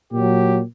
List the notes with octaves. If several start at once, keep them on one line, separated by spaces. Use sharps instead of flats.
A#2 F#3 G4